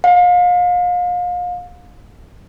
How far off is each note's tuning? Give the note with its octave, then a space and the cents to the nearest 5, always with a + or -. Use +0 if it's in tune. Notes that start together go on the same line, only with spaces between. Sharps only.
F5 +35